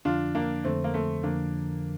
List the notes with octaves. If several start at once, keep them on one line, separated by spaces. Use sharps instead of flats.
F2 D3 F3 D4 F4
A#3 D4
F2 D3 F3 A3 C4
A#3
A3 C4
F2 D3 F3 A#3 D4